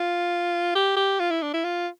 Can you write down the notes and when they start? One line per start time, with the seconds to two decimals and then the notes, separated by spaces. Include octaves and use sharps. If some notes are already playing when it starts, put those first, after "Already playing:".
Already playing: F4
0.75 G4
0.97 G4
1.20 F4
1.31 E4
1.42 D4
1.54 E4
1.64 F4